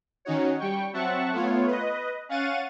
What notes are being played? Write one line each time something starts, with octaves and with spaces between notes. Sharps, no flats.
D#3 C#4 D#4 F#4 C#5
G3 G5 C#6
F#3 C4 E5 F#5 A5 C#6
A3 B3 F4 C#5
B4 D#5
C#4 F5 F#5 C#6 A6 D#7